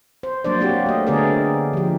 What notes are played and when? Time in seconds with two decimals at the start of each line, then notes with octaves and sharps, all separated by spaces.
0.23 C5
0.44 F#3 A#3 D4 C5 D5
0.60 A#3 C4 F#4 G4
0.86 A3 D#5
1.07 D3 A3 B3 G#4 A#4 D5
1.73 F3 G4